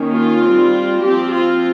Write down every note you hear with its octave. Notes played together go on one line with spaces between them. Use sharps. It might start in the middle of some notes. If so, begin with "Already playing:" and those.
Already playing: D#3 A#3 C#4
F4
G3 C4
F3 C4 G4
F4